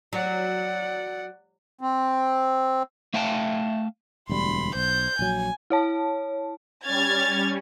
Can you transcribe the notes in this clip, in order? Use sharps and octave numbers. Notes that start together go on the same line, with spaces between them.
F#3 D5 F#5
C4
A3 E5 F5 G5 A5
E1 D2 G3 B5 C6
B1 C5 G6
A#1 F#3 G#5
E4 C#5 A5
G3 C#4 F6 G#6 A6